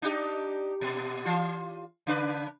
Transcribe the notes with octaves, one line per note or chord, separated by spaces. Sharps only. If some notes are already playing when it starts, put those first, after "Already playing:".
D4 D#4 G4
A#2
E3 F4
C#3 D4 B4